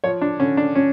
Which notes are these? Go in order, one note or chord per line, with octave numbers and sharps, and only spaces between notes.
F3 C#5
D4
D3 C#4
D4
C#4